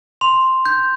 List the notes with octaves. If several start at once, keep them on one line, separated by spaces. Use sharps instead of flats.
C6 F7
G6